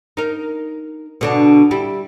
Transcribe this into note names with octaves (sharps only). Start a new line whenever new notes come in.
D#4 A#4
B2 D3 D4
G3 E4